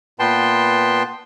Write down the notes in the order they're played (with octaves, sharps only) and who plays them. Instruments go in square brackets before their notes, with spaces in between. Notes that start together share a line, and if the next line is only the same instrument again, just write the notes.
[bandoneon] A#2 B3 B4 G5 A5 C6